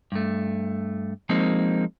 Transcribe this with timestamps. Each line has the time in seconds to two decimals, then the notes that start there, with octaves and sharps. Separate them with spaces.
0.12 G2 A3
1.29 F3 G#3 A#3 C4 D#4